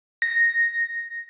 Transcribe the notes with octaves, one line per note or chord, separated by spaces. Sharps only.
A#6